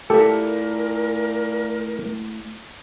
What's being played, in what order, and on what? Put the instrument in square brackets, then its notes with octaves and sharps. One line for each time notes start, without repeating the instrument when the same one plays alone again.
[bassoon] A#2 [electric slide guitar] A3 E4 E5 [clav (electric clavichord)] G4 A4 [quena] A#4